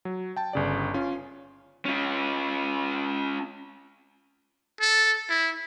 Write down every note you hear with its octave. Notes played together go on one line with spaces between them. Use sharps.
F#3
G5 A5
G1 C#3 D5
C#4 F4
C#4 F4
A4
E4